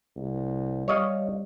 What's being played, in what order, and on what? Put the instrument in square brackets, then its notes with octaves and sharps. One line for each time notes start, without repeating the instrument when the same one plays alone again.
[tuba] C2
[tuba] G3 [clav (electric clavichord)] C#5 D#5 F5